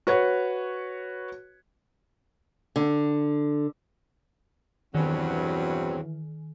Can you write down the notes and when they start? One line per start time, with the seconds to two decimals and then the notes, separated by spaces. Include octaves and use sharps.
0.07 F#4 B4 C#5
2.76 D3
4.95 E2 G2 B2 D#3 E3 F#3 C4